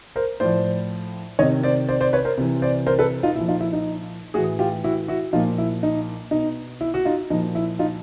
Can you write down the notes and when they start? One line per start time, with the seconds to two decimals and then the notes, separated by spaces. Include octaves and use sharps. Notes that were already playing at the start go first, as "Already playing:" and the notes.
0.16 A#4 C5
0.40 A2 F3 C5 D5
1.39 D#3 C#5 D#5
1.42 C3
1.63 C5 D5
1.89 C5 D5
2.01 C5 D5
2.13 B4 C#5
2.25 A#4 C5
2.38 C3 E3
2.62 C5 D5
2.87 A#4 C5
2.99 A4 B4
3.23 D#4 F4
3.36 A#2 F3 E4
3.48 D#4 F4
3.60 E4
3.73 D#4
4.34 A2 F#4 G#4
4.38 E3
4.59 F4 G4
4.84 E4 F#4
5.08 E4 F#4
5.33 A#2 F3 D#4 F4
5.58 E4
5.83 D#4
6.31 B2 D#4
6.81 E4
6.94 F#4
7.05 D#4 F4
7.30 A#2 F3 D#4
7.55 E4
7.79 D#4 F4